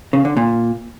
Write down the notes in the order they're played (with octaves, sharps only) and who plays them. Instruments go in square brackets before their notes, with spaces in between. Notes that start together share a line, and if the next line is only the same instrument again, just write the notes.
[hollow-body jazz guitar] C#3
D3
A#2